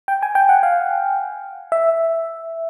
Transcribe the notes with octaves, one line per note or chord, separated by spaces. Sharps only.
G5
G#5
G5
F#5
F5
E5